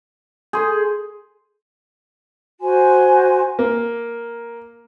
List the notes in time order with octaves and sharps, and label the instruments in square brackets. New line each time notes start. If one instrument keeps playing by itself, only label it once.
[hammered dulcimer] G#4 [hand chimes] A4 C6 G6
[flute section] F#4 C5 G#5 C6
[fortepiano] A#3